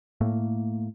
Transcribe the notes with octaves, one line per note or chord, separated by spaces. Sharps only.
A2 A3 A#3